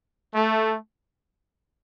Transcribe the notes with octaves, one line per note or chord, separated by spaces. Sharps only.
A3